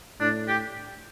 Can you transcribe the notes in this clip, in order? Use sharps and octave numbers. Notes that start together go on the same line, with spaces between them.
A2 D4
G4